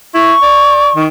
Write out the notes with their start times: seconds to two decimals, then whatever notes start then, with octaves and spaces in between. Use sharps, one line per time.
0.14 E4 C#6
0.42 D5
0.95 D#3